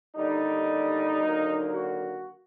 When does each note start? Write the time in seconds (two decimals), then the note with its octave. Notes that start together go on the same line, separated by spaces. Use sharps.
0.15 D#2 D3 G3 D#4
1.19 D#2 D3 F#3 A#3
1.72 F#4